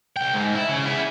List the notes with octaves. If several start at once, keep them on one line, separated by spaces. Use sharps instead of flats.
C2 G5
G#2
E4
C#3
E4 G#4